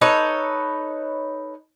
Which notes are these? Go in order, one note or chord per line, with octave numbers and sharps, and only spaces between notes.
D#4 A4 B4 C#5